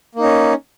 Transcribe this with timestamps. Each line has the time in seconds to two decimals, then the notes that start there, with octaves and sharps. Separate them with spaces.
0.15 A#3
0.19 D#4
0.23 C#4